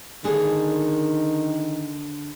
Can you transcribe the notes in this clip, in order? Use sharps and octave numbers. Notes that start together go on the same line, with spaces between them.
D3 D#3 A#3 G#4